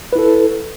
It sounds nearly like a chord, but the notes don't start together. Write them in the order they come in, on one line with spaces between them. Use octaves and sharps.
B4 E4 A4